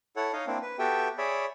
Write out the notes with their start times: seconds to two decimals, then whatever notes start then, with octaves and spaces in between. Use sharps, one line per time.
0.16 E4 A4 C#5 F#5
0.33 D#4 C#5 D#5 F5
0.47 A#3 C4 D4 E4
0.62 B4
0.79 B3 F#4 G4 A4 E5 G5
1.18 G#4 C#5 D5 E5 B5